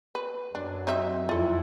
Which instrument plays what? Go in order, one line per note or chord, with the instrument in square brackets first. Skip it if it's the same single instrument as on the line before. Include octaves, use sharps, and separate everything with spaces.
[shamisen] B4
[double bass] F#2 F#3 [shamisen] D4
[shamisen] C4 D#4 E5
[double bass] F2 E4 [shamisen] F4 A4